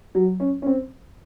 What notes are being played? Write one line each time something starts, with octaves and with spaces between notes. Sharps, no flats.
F#3
C#4
C#4
C4